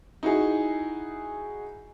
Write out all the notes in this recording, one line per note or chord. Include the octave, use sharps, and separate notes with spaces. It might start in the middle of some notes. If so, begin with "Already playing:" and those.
D#4 E4 F#4 G#4